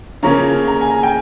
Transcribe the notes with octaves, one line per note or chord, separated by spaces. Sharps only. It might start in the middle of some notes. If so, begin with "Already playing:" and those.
C#3 F3 A#3 C#4 A#5
A#5
G#5
A#5
G5